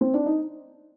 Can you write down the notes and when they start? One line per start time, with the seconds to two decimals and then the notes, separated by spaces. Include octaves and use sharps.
0.01 C4
0.14 D4
0.26 D#4